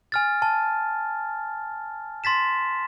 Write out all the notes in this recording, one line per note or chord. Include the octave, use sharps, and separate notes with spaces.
G#5 F6 A6
A5
C6 A6 B6 E7